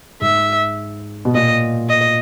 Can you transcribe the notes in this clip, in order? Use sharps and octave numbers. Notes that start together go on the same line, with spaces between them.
G#2 E5
B2
A#2 D#5
D#5